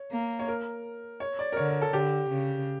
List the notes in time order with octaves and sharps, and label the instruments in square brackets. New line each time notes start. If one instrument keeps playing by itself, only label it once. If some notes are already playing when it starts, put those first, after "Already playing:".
Already playing: [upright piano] C#5
[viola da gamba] A#3
[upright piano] C#5
A#4
C#5
D5
A#4
[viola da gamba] D3 [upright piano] C#5
[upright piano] A#4
A4
[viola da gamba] D3 [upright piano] G4
[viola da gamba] C#3